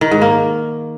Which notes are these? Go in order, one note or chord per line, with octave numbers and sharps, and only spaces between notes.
D#3
G#2
A#3